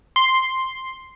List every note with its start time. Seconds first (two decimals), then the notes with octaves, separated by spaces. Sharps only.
0.16 C6